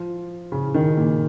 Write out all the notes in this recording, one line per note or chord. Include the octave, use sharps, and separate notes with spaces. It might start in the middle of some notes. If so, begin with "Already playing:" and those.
Already playing: F3
C#3
D#3
A#2